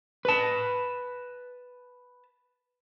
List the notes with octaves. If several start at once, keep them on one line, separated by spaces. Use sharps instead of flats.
B4 A5